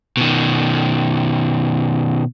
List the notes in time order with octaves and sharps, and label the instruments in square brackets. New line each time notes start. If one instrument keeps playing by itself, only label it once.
[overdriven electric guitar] B2 D#3